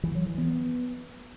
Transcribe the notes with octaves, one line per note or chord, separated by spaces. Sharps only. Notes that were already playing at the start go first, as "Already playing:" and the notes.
E3
F#3
E3
B3